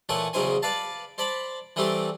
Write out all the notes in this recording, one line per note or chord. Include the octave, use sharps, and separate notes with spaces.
A#2 E3 A3 C#5 F#5 G#5
E2 C#3 F#3 D#4 C5 G#5
B4 D5 F5 A5
C5 D5 A5 B5
E3 G3 A3 C4 G4